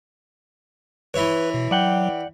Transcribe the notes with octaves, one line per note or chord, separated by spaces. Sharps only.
E3 E4 B4 C#5
B2
F#3 D5 F#5 G5